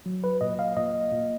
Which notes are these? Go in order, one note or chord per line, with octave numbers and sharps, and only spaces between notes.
F#3
B4
A#2 D#5
F5
A#2 D#5
A#2